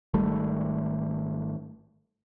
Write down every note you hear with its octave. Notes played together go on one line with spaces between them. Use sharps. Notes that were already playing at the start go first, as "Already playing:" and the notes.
G#1 D#3 G3 A3